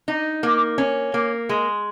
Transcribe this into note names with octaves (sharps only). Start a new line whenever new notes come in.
D#4
A#3
C#4
A#3
G#3